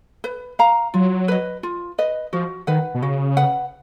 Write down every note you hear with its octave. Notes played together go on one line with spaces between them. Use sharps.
B4
F5 A#5
F#3 F4
B4 D#5
F4
B4 D#5
F3 F#4
D#3 B4 F#5
B2
C#3 F#4
B4 F#5